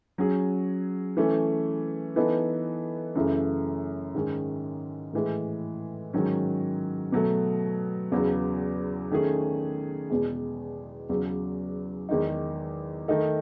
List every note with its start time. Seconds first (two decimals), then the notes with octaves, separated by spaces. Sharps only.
0.18 F#3 C#4 G#4
1.17 E3 A3 C#4
2.16 E3 B3 D#4 A4
3.15 F#2 C#3 E3 A3 E4
4.15 G#2 D#3 G#3 C#4
5.13 A2 E3 G#3
6.13 G#2 D#3 F#3 C#4
7.12 B2 F#3 A3
8.12 E2 C#3 F#3 B3
9.11 D#3 A3 C#4 G#4
10.10 E2 B2 G#3
11.09 E2 C#3 F#3
12.09 E2 D#3 G#3 D#4
13.08 D#3 A3 D#4 A4